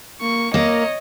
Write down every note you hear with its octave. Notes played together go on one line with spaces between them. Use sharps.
A#3 C#6
A#3 C#5 D#5